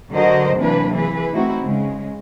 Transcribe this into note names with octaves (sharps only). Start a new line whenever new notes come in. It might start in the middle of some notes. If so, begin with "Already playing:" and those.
D3 F#3 F#4 A#4 C5 D#5
C3 E3 F#3 A#3 D4 B4
E3 G#4 B4
A3 C4 D#4 E4 F#4
C#3 G#3